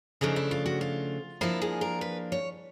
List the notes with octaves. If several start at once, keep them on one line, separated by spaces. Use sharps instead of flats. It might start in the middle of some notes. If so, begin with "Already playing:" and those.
C#3 F3 A3 D4 D#4
E4
F4
F#4
F4
F3 A#3 D4 E4
G#4
A#4
B4
C#5